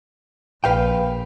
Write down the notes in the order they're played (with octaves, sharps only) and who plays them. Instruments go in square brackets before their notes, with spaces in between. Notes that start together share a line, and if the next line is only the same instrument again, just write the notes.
[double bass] A#1 [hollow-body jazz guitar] B4 F5 G5